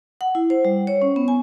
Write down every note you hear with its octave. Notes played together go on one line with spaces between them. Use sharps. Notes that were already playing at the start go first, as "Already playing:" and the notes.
F#5
E4
C5
G3
C#5
C#4
B3
G#5